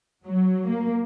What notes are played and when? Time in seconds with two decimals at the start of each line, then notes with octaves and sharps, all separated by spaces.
0.25 F#3
0.66 A#3